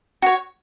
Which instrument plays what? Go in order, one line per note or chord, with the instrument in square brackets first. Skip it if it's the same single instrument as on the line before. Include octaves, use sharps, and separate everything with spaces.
[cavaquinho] F#4 C#5